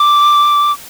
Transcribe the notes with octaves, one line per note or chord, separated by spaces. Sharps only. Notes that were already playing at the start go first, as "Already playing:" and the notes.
Already playing: D6